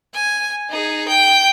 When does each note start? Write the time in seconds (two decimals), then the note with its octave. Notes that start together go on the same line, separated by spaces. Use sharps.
0.14 G#5
0.70 D#4 G#4
1.08 G5